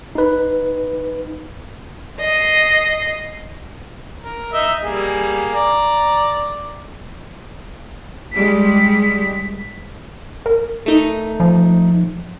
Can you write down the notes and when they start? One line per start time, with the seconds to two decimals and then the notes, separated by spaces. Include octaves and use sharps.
0.15 D#4 B4
2.20 D#5 C7
4.23 A#4
4.53 D#4 D#5 E5
4.83 G3 A#3 G#4
5.54 D5 A#5
8.33 G3 G#3 B6
10.46 A#4
10.86 A3 D#4
11.40 F3